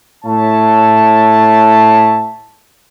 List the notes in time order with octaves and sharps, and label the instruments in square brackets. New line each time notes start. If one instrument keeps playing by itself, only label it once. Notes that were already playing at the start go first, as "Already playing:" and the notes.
[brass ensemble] A2 C#5 E5 A5